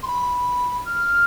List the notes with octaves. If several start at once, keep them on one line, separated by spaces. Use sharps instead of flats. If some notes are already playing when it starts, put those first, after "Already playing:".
C6
B5
F6